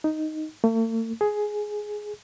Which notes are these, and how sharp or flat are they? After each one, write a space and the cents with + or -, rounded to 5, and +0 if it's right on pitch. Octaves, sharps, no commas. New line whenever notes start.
D#4 +0
A3 +45
G#4 +10